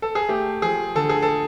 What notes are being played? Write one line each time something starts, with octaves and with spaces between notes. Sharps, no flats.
A4
G#4
A3 G4
F3 G#4
D3 A4
G#4
A4